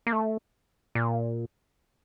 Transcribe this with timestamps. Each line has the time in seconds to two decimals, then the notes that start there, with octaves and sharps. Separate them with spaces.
0.07 A#3
0.13 A3
0.95 A#2